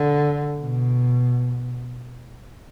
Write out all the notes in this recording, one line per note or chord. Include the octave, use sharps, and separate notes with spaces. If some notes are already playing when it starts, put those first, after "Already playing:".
Already playing: D3
B2